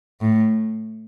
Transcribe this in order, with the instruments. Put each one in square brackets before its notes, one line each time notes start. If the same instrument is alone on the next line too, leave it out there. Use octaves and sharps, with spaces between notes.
[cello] A2